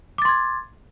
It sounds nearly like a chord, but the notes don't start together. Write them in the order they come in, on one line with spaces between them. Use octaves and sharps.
D6 A6 C6 G#6